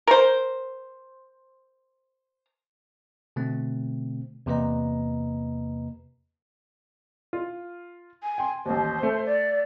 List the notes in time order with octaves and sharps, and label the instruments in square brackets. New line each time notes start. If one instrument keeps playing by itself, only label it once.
[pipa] A#4 C5
[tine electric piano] B2 D3 A3 C4
E2 C3 A#3 B4 D#5 A#5
[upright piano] F4
[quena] G#5
[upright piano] G5 C6
[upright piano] A1 D#2 [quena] C5
[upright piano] A3
[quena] D5